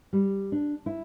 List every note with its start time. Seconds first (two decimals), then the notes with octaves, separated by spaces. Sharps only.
0.13 G3
0.52 D4
0.86 E4